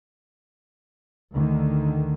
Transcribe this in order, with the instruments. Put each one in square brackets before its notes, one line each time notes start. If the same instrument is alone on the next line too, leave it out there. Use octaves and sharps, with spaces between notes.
[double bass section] D2 D3 D#3